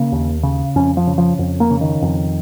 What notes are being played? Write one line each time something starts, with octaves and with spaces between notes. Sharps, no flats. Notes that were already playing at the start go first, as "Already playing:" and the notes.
Already playing: C#3 A#3
D#2
C#3
F2 C#4
F3
C#3
F3
F2
A#3
C#3
D#3
F2